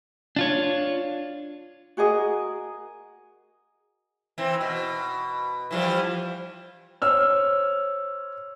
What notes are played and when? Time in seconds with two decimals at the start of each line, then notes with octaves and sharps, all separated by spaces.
0.36 D4 F4 C#5
1.97 F#4 G#4 A#4 D#5
4.38 E3 C4
4.61 B2
5.71 E3 F3 G3
7.02 C5 C#5 E6 F6